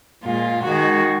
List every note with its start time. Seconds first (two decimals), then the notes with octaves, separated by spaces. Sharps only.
0.23 A#2 G#3 F4
0.63 D#3 G#3 F#4